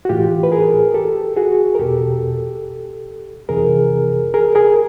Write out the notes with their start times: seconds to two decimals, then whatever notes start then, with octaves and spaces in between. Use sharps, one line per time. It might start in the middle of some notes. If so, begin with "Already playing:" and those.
0.05 F#4
0.09 A2 E3 F4 G4
0.43 B4
0.52 G#4 A#4
0.94 G4 A4
1.37 F#4 G#4
1.75 A#4
1.79 E2 B2 G4 A4
3.49 F2 C3 E3 G#4 A#4
4.34 G#4 A#4
4.55 G#4 A#4